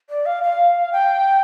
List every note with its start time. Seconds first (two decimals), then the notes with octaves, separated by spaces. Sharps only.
0.09 D5
0.25 F5
0.43 F5
0.92 G5